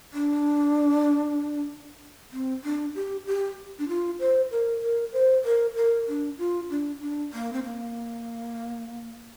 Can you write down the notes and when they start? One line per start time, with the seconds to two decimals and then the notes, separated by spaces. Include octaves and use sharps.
0.13 D4
2.32 C4
2.64 D4
2.95 G4
3.27 G4
3.79 D4
3.88 F4
4.20 C5
4.51 A#4
4.83 A#4
5.13 C5
5.45 A#4
5.76 A#4
6.08 D4
6.39 F4
6.70 D4
7.01 D4
7.33 A#3
7.53 C4
7.63 A#3